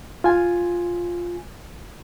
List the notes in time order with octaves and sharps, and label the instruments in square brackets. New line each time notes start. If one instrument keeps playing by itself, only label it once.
[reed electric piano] F4 G#5